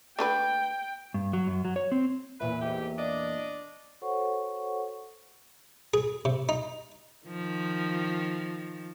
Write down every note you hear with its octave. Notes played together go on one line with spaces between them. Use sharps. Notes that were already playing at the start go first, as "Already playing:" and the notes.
A3 D4 B4 G5
G2
F#3
F#2
F#3
C#5
C4
E2 A#2 B4 E5
G#2 G4
D4 D5 D#5
F#4 A4 C5 C#5 F#5 C#6
G#4
C3
D#4
D#3 F3